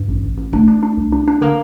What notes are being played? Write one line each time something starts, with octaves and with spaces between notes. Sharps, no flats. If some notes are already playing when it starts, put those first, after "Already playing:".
Already playing: G2
A1
A1
A1
A3 D4
D4
D4
C2
D4
D4
D3 A#3